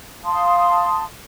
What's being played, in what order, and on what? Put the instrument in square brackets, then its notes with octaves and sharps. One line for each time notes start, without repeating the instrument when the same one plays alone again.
[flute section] F5 A5 C6 D#6